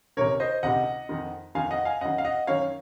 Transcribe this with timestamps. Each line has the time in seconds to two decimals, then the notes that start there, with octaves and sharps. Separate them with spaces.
0.17 C#2 C3 D#3 A#4 C#5
0.40 C5 D#5
0.63 C#2 C3 D#3 D#5 F#5
1.09 F2 D#3
1.55 F2 D#3 F5 G#5
1.71 D#5 F#5
1.85 F5 G#5
2.01 F#2 D#3 D#5 F#5
2.18 F5
2.25 D#5 F#5
2.47 F#2 D#3 C#5 F5